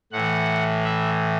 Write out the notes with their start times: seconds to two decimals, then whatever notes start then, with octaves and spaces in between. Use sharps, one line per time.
0.12 A2 E3 F#5
0.84 E5